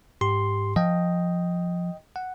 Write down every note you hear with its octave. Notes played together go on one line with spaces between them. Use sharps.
G#2 G4 C6
F3 D#5 G5
F#5